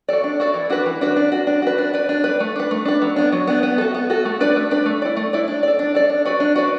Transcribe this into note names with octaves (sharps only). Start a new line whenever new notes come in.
F#4 A4 D5
D4
F#4 A4 D5
E3
D4 F#4 B4
E3
D4 F#4 B4
D4
F#4 B4
D4
F#4 B4
D4
B4 D5
D4
B4 D5
A3
D4 B4
A3
D4 B4
F#3
B3 D4
F#3
B3 D4
B3
F#4 A4
B3
F#4 A4
A3
D4 B4 D5
A3
D4 B4 D5
A3
E4 D5
A3
E4 D5
D4
A4 D5
D4
A4 D5
D4
F#4 B4 D5
D4
F#4 B4 D5